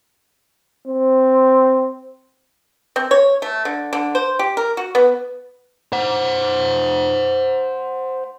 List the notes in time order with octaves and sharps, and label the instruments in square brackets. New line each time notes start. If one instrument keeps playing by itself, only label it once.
[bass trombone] C4
[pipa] C4
C#5
A3
D3
D3
C5
G4
A#4
F#4
B3
[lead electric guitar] C5 F#5